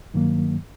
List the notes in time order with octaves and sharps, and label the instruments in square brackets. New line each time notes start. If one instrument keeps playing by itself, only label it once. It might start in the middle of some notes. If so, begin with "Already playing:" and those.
[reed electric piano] G2 D#3 F#3 A#3